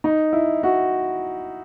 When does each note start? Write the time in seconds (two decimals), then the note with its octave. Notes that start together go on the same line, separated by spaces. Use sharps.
0.04 D#4
0.33 E4
0.63 F#4